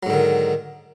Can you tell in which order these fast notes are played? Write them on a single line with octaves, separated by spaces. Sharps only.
F#3 G#2 D3 D#3